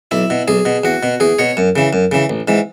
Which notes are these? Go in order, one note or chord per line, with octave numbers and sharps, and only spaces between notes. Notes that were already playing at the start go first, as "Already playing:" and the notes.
B1 E4
B2
B1 G#4
B2
E2 F#4
B2
E2 G#4
B2 C#5
F#2
C#3 E3
F#2
C#3 E3
A1
G#2 E3